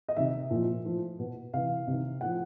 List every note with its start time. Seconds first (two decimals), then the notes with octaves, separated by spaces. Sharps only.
0.08 D#5
0.17 C3 D#3 E5
0.50 A#2 F3
0.85 A2 F3
1.19 B2
1.53 C3 E3 F5
1.87 C3 D#3
2.21 A2 F3 F#5